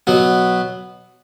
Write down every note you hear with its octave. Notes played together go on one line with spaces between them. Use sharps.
B2 F#3 B3